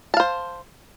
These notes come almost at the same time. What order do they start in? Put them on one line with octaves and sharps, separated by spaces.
A5 F5 C5